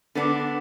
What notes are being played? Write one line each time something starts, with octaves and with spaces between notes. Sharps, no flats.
D3 B3 D4